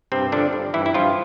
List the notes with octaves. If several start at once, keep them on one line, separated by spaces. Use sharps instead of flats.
G2 C3 C4
D3 F3 D4
G2
G2 E3 E4
E4
G2 F3 F4